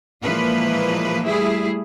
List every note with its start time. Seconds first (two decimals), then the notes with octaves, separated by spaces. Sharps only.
0.23 A#2 E3 F3 G#3 A#3 B4
1.24 G3 A3 E4 G#4